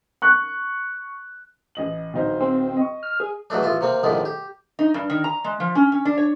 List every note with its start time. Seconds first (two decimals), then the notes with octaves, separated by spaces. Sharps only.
0.22 C#6 F#6
1.75 A1 D#5 F#7
2.14 D1 D#4 C5
2.40 C4
2.77 D#5 C#6
3.03 F6
3.20 G#4
3.50 E3 F#3 G#3 A3 D4
3.63 A1 F4 E5
3.81 C3 A#3 C4
4.03 F2 A2 D3 D#3 G#3
4.25 G4
4.79 D#4
4.94 G2
5.10 D#3
5.24 A#5
5.44 G#3
5.60 F3
5.75 C#4
5.92 C#4
6.05 D4
6.17 C#5